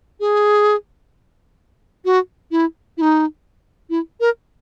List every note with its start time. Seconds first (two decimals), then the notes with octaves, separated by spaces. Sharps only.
0.20 G#4
2.05 F#4
2.51 E4
2.97 E4
3.01 D#4
3.90 E4
4.20 A#4